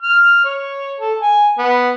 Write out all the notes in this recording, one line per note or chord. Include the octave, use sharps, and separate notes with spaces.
F6
C#5
A4
G#5
B3